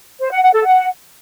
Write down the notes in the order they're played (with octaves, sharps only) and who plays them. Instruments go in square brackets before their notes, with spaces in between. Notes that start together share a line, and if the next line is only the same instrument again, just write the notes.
[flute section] C5
F#5
F#5
A4
F#5